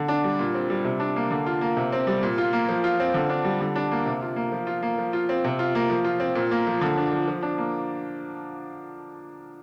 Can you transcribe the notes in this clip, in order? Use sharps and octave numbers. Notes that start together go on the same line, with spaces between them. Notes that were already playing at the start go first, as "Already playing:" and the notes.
Already playing: D3
D4
G3
A#2
C4
G3
C3
D4
A#3
D3
F4
A#3
C3
C4
G3
A#2
F4
A#3
F3
F4
C4
D3
D4
G3
D3
D4
A#3
C3
F4
A#3
F3
F4
A#3
F3
F4
C4
C3
F4
A#3
F3
F4
C4
A#2
A#3
F3
D3
D4
F3
F3
D4
A#3